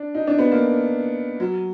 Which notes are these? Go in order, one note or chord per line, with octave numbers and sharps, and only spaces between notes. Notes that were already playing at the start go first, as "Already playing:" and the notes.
Already playing: D4
D#4
D4
B3
A#3
F#3